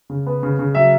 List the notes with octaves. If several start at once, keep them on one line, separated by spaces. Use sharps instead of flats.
C#3
B3
C#3
C#3
F#3 E5